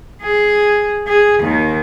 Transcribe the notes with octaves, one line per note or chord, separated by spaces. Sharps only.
G#4
G#4
D#2 D#3